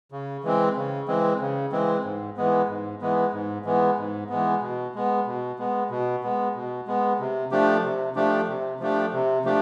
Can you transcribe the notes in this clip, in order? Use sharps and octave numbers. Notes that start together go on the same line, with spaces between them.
C#3
E3 G#3 C4
C#3
E3 G#3 C4
C#3
E3 G#3 C4
G#2
E3 G#3 B3
G#2
E3 G#3 B3
G#2
E3 G#3 B3
G#2
E3 G#3 B3
B2
G#3 B3
B2
G#3 B3
B2
G#3 B3
B2
G#3 B3
C3
F3 A3 D4 G4
C3
F3 A3 D4 G4
C3
F3 A3 D4 G4
C3
F3 A3 D4 G4